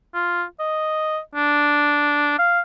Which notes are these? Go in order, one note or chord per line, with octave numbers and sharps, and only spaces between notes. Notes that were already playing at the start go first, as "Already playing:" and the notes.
F4
D#5
D4
F5